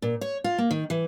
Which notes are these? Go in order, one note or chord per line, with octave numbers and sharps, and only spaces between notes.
A#2
C#5
F4
A#3
D#3
E3